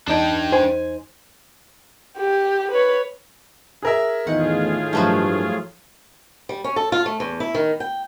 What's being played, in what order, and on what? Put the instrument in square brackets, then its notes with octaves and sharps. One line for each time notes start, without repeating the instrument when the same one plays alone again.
[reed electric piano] E2 D#4 [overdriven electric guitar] D4 G5 [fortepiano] D5 A5
[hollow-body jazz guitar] C5 [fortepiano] G#5
[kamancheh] G4
B4 C#5
[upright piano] G#4 A#4 E5
[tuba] E2 [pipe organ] A2 F4 G#4 [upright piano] D#3 [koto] F#5
[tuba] G2 [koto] F3 F#3 A3
[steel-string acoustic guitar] G3
C#4
A4
F4
A3
E2
E4
D#3
G5